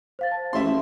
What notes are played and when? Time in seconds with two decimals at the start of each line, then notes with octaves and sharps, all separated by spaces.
0.19 C5 F5 A6
0.31 A5
0.53 A1 E5 C6
0.67 A1